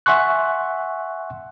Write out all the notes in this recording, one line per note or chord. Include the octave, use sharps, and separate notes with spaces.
E5 F#5 G#5 C6 C#6 F#6